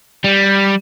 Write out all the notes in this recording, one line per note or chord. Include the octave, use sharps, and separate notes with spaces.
G3